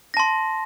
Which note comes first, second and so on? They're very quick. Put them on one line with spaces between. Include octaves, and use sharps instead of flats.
A#6 A5 C6